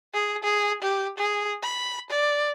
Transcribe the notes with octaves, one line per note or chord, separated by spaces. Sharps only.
G#4
G#4
G4
G#4
B5
D5